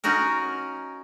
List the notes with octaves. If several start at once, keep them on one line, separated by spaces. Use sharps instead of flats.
C#4 D#4 F#4 A#4